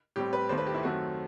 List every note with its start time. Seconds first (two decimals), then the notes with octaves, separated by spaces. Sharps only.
0.16 A2 G3 C4 G4
0.33 B4
0.49 D#2 D#3 A3 C5
0.58 B4
0.67 G4
0.74 E4
0.83 F#2 D#3 A3 C4 F#4